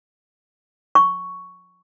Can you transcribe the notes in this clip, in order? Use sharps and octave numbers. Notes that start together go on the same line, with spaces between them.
C#6